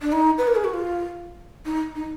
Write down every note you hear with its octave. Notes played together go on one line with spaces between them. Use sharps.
D4
D#4
B4
A#4
G#4
F#4
F4
D#4
D#4